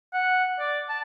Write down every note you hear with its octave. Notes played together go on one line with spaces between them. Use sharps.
F#5
D5
A5